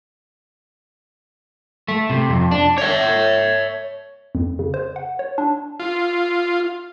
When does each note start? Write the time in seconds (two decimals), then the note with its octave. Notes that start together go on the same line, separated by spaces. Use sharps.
1.88 A3
2.10 C3
2.29 F2
2.51 D4
2.78 C#5 E5
4.35 F2
4.59 C#3
4.74 C5
4.96 F#5
5.19 C#5
5.38 D4
5.80 F4